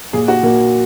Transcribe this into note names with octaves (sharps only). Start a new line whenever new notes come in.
A#2 G#4
F#4
A#2 A#3